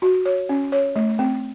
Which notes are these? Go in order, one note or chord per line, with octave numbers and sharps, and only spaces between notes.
F#4
C#5
C#4
C#5
A3
C4